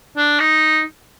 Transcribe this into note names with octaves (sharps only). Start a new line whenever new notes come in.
D4
D#4